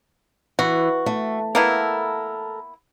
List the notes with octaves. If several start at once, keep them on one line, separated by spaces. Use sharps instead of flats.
E3 F#4
A3
A#3 B3 E4 A4 A#4